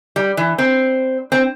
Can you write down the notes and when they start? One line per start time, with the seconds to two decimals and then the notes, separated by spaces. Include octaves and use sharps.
0.16 G3
0.37 E3
0.58 C4
1.32 C4